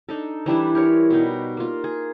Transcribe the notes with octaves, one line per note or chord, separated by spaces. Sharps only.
D4 D#4 A4
E3 G3 D4 E4
G4 A#4 C#5
B2 G3 D#4
A#3 F4
G#4